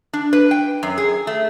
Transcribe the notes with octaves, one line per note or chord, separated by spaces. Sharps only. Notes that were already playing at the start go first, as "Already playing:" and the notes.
D4
B4
G5
F#2
G#4
A3